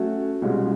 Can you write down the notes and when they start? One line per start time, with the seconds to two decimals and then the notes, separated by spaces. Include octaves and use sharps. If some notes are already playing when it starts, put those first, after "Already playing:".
Already playing: F#3 A3 C#4 F#4
0.42 C2 B2 G#3 C#4 F4